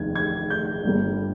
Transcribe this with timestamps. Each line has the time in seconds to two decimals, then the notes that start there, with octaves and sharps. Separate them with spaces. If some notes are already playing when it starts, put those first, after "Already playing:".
Already playing: F1 D#2 D3 G#6
0.15 G#6
0.50 G6
0.84 G1 G2 D3 G3 A#3